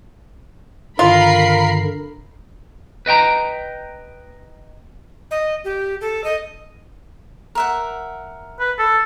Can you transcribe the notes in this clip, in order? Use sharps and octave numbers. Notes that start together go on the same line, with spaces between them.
G2 D3 D#3 F4 A#4 B5 C7
B4 D#5 G5 A#5
D#5
G4
A4
D#5
A#4 E5 F#5
B4
A4